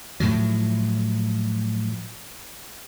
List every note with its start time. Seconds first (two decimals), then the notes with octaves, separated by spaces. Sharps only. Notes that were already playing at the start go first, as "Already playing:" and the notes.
0.20 A2 F3 F#3